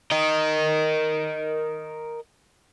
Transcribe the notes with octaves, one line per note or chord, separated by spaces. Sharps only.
A#4 D#5